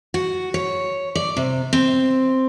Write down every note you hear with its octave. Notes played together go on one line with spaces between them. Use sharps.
F#4
C#5
D5
C3
C4